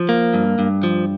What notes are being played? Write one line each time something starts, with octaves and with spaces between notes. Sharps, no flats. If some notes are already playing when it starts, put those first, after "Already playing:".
Already playing: F3
A#3
G2
G2
F3